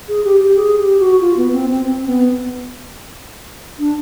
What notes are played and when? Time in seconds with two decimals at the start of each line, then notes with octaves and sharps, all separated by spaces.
0.09 G#4
0.24 G4
0.40 G4
0.56 G#4
0.78 G4
1.00 F#4
1.21 F4
1.37 B3
1.53 C4
1.70 C4
1.86 C4
2.07 B3
3.79 D4